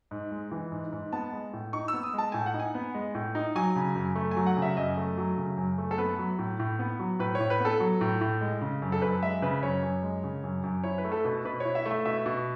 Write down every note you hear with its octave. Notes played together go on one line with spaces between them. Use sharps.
G#2
G#3
E3
G#2
G#2
B3 A5
G#3
A2
D#4 C#6
E6
B3
D#6
G#3 A5
A2 G#5
F#5
D#4
G#5
B3
G#3
A2
D#4
F#3 G#5
C#3
F#2
A3
G#5
F#3
F#5
C#3
E5
F#2 D#5
A3
F#3
C#3
F#2
A3
A4
B3 B4
F#3
A2
A2
B3
F#3
A2 B4
C#5
A2
B4
B3 A4
F#3
A2
A2
G#3
C#3
F#2
A4
F#2 B4
G#3 E5
C#3 B4
F#2 C#5
F#2
G#3
C#3
F#2
F#2
E4 C#5
B4
A3
A4
B2 B4
B2 B4
E4 C#5
E5
A3
E5
B2 E5
B2